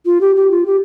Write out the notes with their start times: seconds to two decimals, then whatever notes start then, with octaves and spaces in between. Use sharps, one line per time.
0.05 F4
0.21 G4
0.36 G4
0.51 F4
0.66 G4